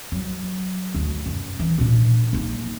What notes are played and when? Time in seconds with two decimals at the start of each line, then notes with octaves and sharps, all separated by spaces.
0.12 F#3
0.95 D2
1.26 F#2
1.59 E3
1.78 A#2 D4
2.33 A#3 D#4